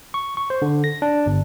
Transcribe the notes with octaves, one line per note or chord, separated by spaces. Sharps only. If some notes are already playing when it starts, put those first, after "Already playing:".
C#6
C#6
C5
D3
A#6
D4
G1